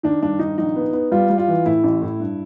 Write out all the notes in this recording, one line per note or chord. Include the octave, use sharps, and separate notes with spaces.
D#3 D4
G2 D4
D#3 D#4
A#1 D#4
B3
B3
G3 F4
G3
F4
E3
A2 E4
A1
A2
G2